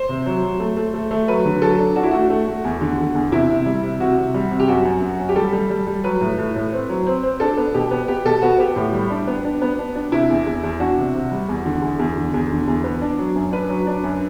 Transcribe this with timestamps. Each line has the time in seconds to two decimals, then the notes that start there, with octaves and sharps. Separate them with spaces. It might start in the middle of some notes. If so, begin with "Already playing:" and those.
Already playing: C5
0.09 C3
0.26 F#3
0.43 F#3
0.60 A3
0.77 A3
0.94 A3
1.11 A3
1.28 F#3 B4
1.45 D3
1.62 F#3 A4
1.79 D4
1.96 D4 F#4
2.03 E4
2.11 A3 F#4
2.30 A3
2.47 A3
2.64 E2
2.81 D3
2.98 D3
3.15 E2
3.32 C3 E4
3.49 C3
3.66 G3
3.83 C3
4.00 C3 F#4
4.17 C3
4.34 G3
4.51 C3
4.60 G4
4.68 F#2 F#4
4.85 F#2
5.02 F#2
5.20 F#2
5.29 G4
5.36 G3 A4
5.53 G3
5.70 G3
5.87 G3
6.04 F#3 B4
6.21 A2
6.38 A2
6.56 A2
6.73 C4
6.89 F#3
7.07 C4
7.23 C4
7.40 D4 A4
7.57 B3
7.74 B2 G4
7.91 B3
8.08 B3 G4
8.25 B2 A4
8.42 B3 F#4
8.59 B3 G4
8.76 A2
8.93 G3
9.10 D4
9.27 B3
9.45 D4
9.62 B3
9.79 D4
9.95 D4
10.12 C3 E4
10.30 E2
10.46 E2
10.63 E2
10.80 D4 F#4
10.97 C3
11.14 C3
11.32 G3
11.49 E2
11.66 D3
11.82 E2
11.99 E2
12.16 D3
12.34 E2
12.51 D3
12.68 E2
12.84 B3
13.02 D4
13.19 F#3
13.36 F#2
13.52 D4 B4
13.69 F#3
13.87 D4
14.04 F#2